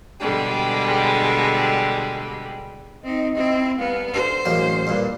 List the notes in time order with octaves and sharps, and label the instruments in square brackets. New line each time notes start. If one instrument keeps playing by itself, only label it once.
[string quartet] B2 D3 G3 G#3
[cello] C4 D#4 [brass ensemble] D#5
[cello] C4 E4
[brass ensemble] C2 F5 [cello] B3
[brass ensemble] D3 [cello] C5
[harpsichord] A1 F#2 A#3 [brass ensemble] G#3
[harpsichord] G2 A#2 [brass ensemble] A#3 B4 D5